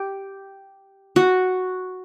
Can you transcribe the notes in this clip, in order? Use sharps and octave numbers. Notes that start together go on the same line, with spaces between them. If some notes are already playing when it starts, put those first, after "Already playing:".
Already playing: G4
F#4